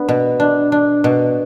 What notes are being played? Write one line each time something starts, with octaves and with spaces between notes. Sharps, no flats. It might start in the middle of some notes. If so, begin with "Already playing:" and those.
Already playing: B3 D4
B2
D4
D4
B2